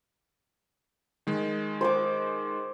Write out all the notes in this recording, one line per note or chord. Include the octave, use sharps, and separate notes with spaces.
D#3 G#3
C5 C#6 D6